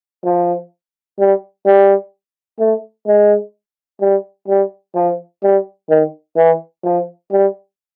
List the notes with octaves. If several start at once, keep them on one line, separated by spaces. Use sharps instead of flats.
F3
G3
G3
A3
G#3
G3
G3
F3
G3
D#3
E3
F3
G3